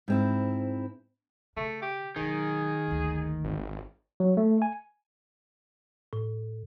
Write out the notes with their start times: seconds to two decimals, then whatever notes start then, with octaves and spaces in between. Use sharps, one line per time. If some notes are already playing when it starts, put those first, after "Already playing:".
0.08 G#2 C4 E4
1.57 C#3 A3
1.82 G4
2.16 E1 D#3 F#3 G#4
2.87 F#1 D2
3.44 G#1
4.20 F#3
4.37 A3
4.62 G#5
6.13 A2